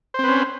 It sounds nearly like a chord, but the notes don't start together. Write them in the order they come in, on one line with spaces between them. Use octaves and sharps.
C5 C4 B4 C#4